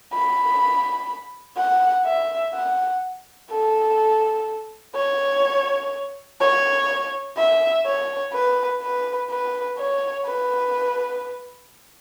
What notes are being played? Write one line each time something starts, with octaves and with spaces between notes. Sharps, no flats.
B5
F#5
E5
F#5
A4
C#5
C#5
E5
C#5
B4
B4
B4
C#5
B4